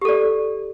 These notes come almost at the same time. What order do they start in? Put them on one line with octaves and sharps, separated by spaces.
G4 A4 D5